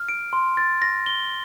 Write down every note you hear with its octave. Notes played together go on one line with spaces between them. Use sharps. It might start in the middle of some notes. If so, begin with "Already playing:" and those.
Already playing: F6
D7
C6
A6
A#6
G7